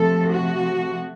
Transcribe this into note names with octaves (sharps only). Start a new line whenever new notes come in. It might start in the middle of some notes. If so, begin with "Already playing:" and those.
Already playing: C3 F3 A3 A4
F#4